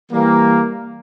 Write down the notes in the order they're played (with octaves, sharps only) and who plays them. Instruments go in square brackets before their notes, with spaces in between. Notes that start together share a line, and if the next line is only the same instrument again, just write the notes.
[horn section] E3 G3 A#3